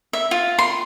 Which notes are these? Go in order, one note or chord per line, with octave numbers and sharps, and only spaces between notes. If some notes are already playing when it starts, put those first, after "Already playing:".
E5
F4
C6